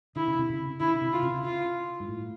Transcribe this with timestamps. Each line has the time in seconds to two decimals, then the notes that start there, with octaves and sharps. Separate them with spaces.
0.16 D3 E4
0.27 C#3
0.39 C3
0.50 C#3
0.80 D3 E4
0.94 C#3
1.01 C3
1.13 F4
1.23 C#3
1.44 F4
2.00 G#2
2.08 A2